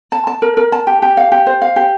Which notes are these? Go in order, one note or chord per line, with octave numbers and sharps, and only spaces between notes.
A5
A5
A#4
A#4
A5
G4
G4
F5
G4
C5
F5
G4